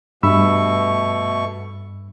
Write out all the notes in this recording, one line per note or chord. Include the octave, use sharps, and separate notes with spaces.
G2 B2 A3 B5 C#6 E6